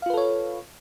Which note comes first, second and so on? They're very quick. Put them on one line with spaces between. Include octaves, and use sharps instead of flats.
F5 F4 B4 A4 C#5